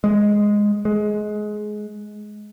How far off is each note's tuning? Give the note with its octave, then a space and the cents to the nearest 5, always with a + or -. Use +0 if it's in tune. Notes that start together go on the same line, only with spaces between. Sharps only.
G#3 -5
G#3 +20